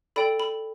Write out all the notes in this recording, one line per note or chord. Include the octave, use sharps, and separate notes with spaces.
A4 D5 G5 B5
B5